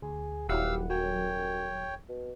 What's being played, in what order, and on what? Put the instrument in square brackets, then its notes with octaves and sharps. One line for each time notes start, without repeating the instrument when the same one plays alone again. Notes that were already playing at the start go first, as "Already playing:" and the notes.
[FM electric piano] D2 [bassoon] G#4
[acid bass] D#1 [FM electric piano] F#3 E4 F#5 [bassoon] G4 [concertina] F5 E6
[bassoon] F#2 [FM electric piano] F#3 [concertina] C#5 G5
[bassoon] B2